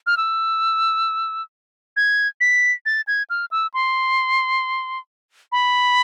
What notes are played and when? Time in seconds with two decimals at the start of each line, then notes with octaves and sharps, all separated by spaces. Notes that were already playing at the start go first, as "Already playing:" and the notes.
0.07 F6
0.17 E6
1.97 G#6
2.41 B6
2.86 A6
3.07 G#6
3.30 F6
3.51 E6
3.74 C6
5.52 B5